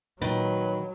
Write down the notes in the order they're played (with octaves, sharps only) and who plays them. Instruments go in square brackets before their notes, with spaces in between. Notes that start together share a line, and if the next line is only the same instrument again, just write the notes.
[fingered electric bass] A#2 [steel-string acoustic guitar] D#3 [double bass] F#3 [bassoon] B4